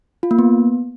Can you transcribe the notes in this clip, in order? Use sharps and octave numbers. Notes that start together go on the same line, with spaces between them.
F4
A#3
B3